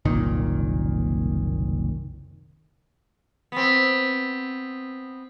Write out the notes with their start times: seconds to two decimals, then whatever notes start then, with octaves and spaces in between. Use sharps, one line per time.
0.05 F#1 C2 A#2 D#3
3.52 B3 C4